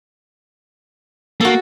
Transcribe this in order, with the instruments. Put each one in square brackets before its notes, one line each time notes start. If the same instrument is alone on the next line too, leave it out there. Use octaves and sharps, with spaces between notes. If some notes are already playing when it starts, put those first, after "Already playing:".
[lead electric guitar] A#3 [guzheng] F#4 A4